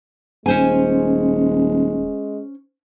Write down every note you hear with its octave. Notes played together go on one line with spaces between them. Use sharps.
D#1 G#3 C#4 C5 G#5